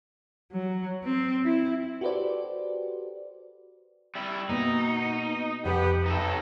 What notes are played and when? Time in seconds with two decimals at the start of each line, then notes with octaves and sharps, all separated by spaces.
0.52 F#3
1.04 C4
1.44 E4
2.01 F#4 G4 A4 B4 C5 D5
4.15 G3 E4
4.49 B2 A#3 B3 D#4
5.65 F2 C3 B3 G4 E5
6.06 B1 D#4 A4